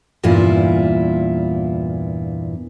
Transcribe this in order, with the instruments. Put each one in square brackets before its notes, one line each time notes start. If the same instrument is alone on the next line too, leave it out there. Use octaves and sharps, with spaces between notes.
[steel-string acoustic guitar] E2 G2 A#2 E4 F4